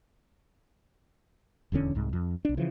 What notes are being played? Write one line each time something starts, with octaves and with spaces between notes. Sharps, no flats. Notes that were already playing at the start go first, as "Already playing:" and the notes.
D#1 E2 D3 C#4
C2 G#2
F2
B1 D4
C#3 E3 F3